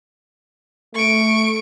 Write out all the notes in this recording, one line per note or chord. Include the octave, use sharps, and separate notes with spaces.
A3 C#6 D7